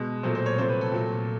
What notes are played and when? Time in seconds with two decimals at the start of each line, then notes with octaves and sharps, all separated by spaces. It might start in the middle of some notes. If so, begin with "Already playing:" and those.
Already playing: B2 G#3
0.23 A#2 F#3 A3 C5
0.35 C5
0.46 C#5
0.58 C3 F3 A3 C5
0.69 B4
0.81 A4
0.92 A#2 F#3 A3